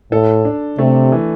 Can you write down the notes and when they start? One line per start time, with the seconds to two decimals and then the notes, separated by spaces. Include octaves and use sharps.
0.12 A2 A4
0.45 D4
0.78 C3 A3
1.12 E3